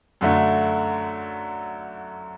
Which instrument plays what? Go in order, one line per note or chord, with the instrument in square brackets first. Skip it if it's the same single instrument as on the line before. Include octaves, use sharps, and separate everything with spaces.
[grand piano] F#2 D3 A3